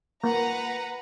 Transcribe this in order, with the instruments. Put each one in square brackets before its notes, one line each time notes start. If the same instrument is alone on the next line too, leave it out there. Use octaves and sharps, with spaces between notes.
[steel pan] A#3 [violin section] B4 F#5 A#5